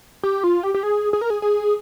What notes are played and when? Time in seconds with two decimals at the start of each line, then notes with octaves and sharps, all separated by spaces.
0.23 G4
0.44 F4
0.63 G4
0.74 G4
0.83 G#4
1.13 G#4
1.21 A#4
1.30 G#4
1.42 G#4